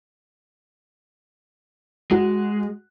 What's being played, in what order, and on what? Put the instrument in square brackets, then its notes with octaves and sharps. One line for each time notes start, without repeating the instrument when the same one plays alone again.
[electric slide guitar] G#3 [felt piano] F#4